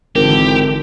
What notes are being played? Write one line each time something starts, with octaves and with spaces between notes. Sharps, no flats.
G#1 D3 E3 G4 A#4